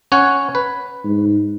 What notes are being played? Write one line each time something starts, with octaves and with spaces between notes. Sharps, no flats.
C#4 C#5 F#5
B4
G#2